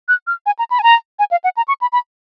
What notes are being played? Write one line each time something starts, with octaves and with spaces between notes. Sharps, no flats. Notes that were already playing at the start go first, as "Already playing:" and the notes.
F#6
F6
G#5
A#5
B5
G#5
A#5
G#5
F5
F#5
A#5
C#6
B5
B5